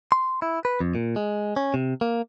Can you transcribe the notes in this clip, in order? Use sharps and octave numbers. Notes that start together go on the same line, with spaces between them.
C6
E4
B4
F2
A#2
G#3
C#4
C3
A#3